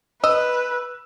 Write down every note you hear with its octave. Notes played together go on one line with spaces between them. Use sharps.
B4 D#5 E6